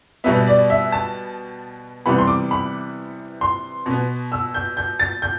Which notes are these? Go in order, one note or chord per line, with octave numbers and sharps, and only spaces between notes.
B2 G3 B3 E5
D5
E5
A5
C3 E3 G3 B3 B5
C6
D6
B5
C6
B2 B3
E6
G6
G6
A6
G6